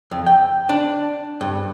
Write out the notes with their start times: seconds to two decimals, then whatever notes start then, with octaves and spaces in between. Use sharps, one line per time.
0.11 F2
0.26 G5
0.69 D4
1.41 G2